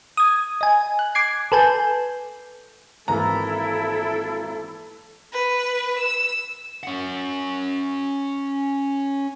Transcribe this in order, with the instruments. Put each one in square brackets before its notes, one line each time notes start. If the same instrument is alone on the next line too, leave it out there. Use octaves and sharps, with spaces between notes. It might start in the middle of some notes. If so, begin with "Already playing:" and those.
[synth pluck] D#6 G#6
D#5 G#5
F#6
D6 G#6 C7
A4 B4 G#5 A5 G6
[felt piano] G#1 E3 A#3 [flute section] E4 [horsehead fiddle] A4 [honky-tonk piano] A#5
[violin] B4
E6
[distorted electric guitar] C#4 F#5